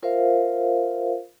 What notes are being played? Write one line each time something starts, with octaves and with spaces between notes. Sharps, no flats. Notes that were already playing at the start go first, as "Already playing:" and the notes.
F4 A#4 C5 E5 F5